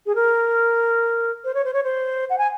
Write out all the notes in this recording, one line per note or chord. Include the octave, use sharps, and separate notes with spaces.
G#4
A#4
C5
C#5
C5
C#5
C5
F#5
G#5